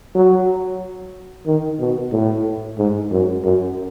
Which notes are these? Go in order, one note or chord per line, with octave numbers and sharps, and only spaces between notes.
F#3
D#3
B2
A2
G#2
F#2
F#2